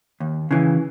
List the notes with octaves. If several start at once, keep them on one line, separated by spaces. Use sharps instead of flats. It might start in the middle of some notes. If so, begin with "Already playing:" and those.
D#2
C#3 E3